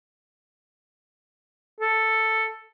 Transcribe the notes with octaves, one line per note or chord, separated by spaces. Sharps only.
A4